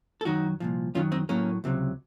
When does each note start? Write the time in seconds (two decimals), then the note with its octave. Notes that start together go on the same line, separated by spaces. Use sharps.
0.21 A4
0.25 F#2 D#3 F#3 D#4 F#4
0.60 C2 A#2 F3
0.95 F#2 D#3 F#3 C#4 F4
1.12 C4 D#4
1.29 A2 F#3 A#3 C#4
1.64 C#2 C3 F#3